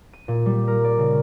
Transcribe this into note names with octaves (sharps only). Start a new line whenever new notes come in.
D#7
A#2
G3
A#4
D5
C#3